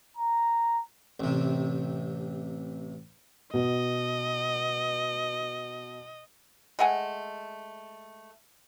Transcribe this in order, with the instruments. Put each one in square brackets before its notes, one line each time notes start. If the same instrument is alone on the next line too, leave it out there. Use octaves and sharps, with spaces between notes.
[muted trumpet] A#5
[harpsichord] A1 C3
[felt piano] B2 [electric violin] D#5
[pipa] G#3 A3 F#5 G#5